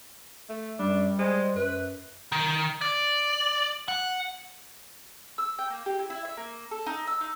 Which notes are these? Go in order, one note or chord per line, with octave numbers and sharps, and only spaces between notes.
A3
F#2 G3 D4
G#3 C5
F#2 B4
D#3
D5
F#5
E6
G5
A#3
G4
E4
E4
E5
A#3
A4
D#4
E6
D#4